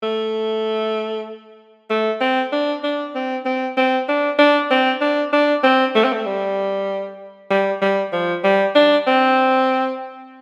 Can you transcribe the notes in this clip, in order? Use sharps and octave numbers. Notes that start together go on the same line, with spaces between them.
A3
A3
C4
D4
D4
C4
C4
C4
D4
D4
C4
D4
D4
C4
A3
C4
A3
G3
G3
G3
F3
G3
D4
C4